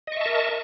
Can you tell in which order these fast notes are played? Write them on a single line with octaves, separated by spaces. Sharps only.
D#5 C#6 E5 A5 A#4